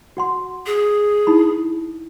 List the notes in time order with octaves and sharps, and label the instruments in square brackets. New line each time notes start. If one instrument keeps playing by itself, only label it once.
[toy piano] F#4 F#5 C6
[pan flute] G#4
[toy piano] D#4 E4 B5